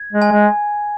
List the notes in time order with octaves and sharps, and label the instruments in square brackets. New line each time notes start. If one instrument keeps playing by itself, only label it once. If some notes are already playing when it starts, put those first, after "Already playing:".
Already playing: [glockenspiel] G#6
[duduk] G#3
[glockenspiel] G#5
[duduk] G#3